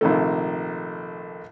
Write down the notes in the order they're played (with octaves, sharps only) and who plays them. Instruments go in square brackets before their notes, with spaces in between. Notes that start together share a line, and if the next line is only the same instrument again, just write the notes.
[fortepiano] A#1 C3 D#3 A3